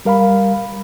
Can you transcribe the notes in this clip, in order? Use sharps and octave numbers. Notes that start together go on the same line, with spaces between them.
G3 A#4 F5 A#5 B5